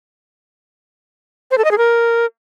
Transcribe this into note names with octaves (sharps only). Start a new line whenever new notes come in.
C5
A4
D#5
G#4
A#4